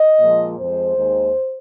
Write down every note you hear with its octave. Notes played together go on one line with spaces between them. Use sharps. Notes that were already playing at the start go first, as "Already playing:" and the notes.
Already playing: D#5
A#2 F3 G#3
F2 F3 G#3 C5
D#2 D#3 G#3